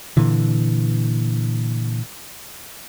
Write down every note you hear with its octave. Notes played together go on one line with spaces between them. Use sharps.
A#2 D3 E3